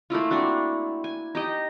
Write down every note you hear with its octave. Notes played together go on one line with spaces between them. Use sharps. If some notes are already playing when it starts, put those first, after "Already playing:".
A3 A#3 E4 F4
C4 D4 F#4
G#5
D#4 G4 D#5